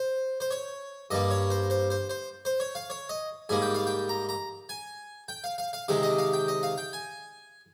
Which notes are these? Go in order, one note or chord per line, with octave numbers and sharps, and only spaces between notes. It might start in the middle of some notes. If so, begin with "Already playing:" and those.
Already playing: C5
C5
C#5
G2 G3 A#3 D#5
C#5
C5
C5
C5
C5
C5
C#5
F5
C#5
D#5
G#2 G3 A#3 G#5
G5
F5
G5
A#5
A#5
G#5
G5
F5
F5
F5
C3 D#3 G#3 F5
D#5
F5
G5
D#5
F5
G5
G#5